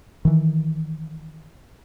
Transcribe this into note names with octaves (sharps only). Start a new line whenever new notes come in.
D#3 E3